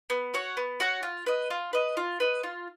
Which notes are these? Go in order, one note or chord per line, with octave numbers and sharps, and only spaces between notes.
B3
F#4 C#5 F#5
B3
F#4 C#5 F#5
F4
B4 D#5
F4
B4 D#5
F4
B4 D#5
F4